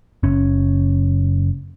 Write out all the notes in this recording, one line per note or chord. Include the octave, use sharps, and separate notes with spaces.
F#1 C#4